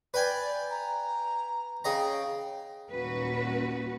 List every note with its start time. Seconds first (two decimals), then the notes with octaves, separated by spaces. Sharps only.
0.14 B4 D5 G5 G#5
0.70 A#5
1.84 C#3 D#5 G5 A#5
2.93 D#2 A#2 G3 C#4 F#4 B4